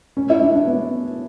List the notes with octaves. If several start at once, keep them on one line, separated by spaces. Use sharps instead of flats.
C#4
E4
D4
D4
B3